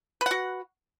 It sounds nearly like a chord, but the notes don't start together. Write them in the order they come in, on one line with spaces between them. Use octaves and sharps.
B4 F#5 F#4